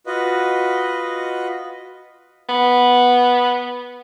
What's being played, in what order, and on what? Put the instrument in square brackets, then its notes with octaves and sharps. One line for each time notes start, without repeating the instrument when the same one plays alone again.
[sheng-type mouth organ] F4 F#4 B4 D#5
[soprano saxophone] B3